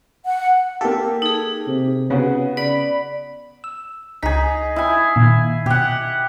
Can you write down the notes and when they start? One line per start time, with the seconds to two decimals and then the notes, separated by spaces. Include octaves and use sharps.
0.25 F#5
0.81 A#3 G4 A4
1.22 D#4 G#4
1.68 C3
2.10 C#3 B3 F#4
2.57 C#3 D5 B5
3.64 E6
4.23 C#2 D#4 G#4 A#5 B6
4.76 E4 G#5
5.16 A#2 D#3
5.66 B2 G4 F#5